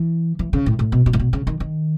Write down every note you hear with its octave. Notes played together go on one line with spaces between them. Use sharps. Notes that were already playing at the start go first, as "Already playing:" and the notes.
Already playing: E3
E3
C#3
A2
A2
B2
B2
A2
B2
C#3
D#3
D#3